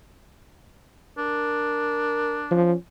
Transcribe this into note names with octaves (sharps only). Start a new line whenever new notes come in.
D4 A#4
F3 C#4